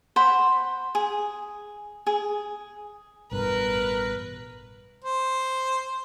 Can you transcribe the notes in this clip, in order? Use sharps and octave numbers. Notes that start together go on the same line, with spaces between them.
C5 F#5 B5
G#4
G#4
A1 G2 B2 A#4 B4
C5